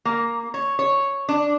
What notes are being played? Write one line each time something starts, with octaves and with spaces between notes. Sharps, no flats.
A#3
C#5
C#5
D4